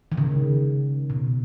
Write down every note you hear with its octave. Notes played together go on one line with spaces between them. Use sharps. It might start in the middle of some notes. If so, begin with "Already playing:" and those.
D#3
C#3
B2